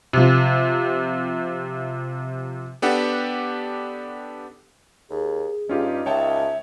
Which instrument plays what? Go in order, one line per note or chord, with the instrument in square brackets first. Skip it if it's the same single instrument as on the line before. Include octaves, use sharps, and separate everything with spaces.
[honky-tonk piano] C3 F3
[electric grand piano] B3 D4 G4 A4 F#5
[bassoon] D#2 [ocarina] G#4
[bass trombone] G2 [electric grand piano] C#4 F4 G4 [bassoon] D#4
[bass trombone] C#2 [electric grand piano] C#5 G5 A5 [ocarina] E5